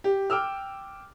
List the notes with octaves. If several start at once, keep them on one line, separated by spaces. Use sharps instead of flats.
G4
G5 D6 E6 F6